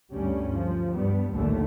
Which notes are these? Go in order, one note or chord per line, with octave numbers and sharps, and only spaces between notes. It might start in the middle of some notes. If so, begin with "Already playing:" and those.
D2 G2 G3 C#4
F3
G2 G3 B3
A#1 D#2 A2 D3 A3